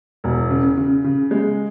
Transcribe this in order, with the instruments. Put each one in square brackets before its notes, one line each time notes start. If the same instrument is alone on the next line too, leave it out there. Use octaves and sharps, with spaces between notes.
[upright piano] E1
C#3
C#3
C#3
G#3